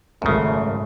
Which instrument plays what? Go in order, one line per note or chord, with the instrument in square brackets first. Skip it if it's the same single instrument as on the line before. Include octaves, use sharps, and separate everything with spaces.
[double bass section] G#1 [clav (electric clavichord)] F#2 C#3 [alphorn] A3